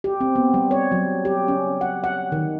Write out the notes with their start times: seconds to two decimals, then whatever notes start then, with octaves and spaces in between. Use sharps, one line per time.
0.04 G4
0.21 C4
0.36 B3
0.54 G3
0.71 C#5
0.92 F#3
1.25 G4
1.48 C#4
1.81 F#5
2.04 F#5
2.32 D#3